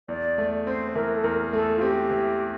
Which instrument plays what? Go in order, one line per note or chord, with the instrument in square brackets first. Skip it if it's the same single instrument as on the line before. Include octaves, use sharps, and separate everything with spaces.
[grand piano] E2 [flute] D5
[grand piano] A3
[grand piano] C4 [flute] C5
[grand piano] E3 [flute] A#4
[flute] A4
[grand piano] E2 [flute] A#4
[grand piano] A3 [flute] A4
[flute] F4
[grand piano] C4 [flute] G4
[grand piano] E3